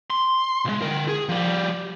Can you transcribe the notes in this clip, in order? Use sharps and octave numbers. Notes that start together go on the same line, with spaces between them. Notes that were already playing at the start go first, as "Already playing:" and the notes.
C6
B1 G#3
D3 A#4
G#4
F3 G3